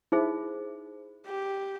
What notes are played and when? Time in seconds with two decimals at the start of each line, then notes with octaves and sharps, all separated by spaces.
0.12 D#4 E4 G#4 C5
1.26 G4